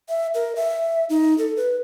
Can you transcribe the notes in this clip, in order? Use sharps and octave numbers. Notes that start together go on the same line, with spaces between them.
E5
A#4
E5
D#4
A4
B4